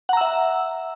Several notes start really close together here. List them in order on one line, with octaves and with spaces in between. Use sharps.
F#5 A#5 E6 E5